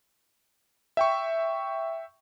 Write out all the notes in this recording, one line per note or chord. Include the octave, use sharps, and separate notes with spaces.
E5 G5 C#6